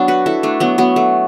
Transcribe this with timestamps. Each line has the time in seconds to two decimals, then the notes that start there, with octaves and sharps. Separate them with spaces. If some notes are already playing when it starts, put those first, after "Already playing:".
Already playing: F#3 B3 D4
0.08 F#4 B4
0.26 E4 A4
0.43 A3 D4
0.60 F#3 B3
0.78 F#3 B3
0.96 A3